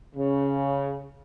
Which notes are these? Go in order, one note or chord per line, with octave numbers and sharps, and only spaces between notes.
C#3